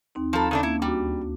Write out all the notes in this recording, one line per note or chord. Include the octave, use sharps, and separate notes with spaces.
D#2 C4 D#4
F3 A4 F5 A#5 B5
C#3 A3 C#4 D4
A#3 D4 E4
D2 G3 F#4